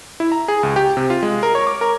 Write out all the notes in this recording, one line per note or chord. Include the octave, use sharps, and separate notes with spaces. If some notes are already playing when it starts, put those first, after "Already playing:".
E4
A#5
G#4
C#2
G4
C3
F4
G#3
A#4
C#5
D6
A#4